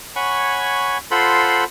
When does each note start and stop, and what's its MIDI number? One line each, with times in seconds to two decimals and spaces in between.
0.16 0.98 73
0.16 0.98 78
0.16 0.98 80
0.16 0.98 83
0.16 0.98 85
1.11 1.64 65
1.11 1.64 69
1.11 1.64 72
1.11 1.64 78
1.11 1.64 83
1.11 1.64 84